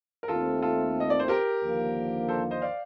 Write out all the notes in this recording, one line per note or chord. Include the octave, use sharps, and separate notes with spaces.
A#4
D#2 D#3 A3 C4 F4 A4
F4 A4
D#5
D5
C5
G4 A#4
D#2 D3 F3 A#3
A4 C5
C5 D#5
D5 F5